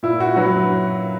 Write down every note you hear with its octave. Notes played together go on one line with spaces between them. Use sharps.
A#2 E4
F#4
F#3 B4